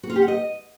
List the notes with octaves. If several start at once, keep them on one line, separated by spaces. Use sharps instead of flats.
F#4
F4
G4
F#5
D#5